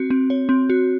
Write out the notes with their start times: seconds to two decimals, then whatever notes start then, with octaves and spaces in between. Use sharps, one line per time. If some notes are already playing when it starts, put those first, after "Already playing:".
Already playing: C4 F#4
0.10 C4
0.30 C#5
0.49 C4
0.70 F#4